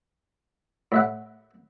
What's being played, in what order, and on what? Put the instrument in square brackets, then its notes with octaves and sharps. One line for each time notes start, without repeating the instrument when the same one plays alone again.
[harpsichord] A2 E5 F#5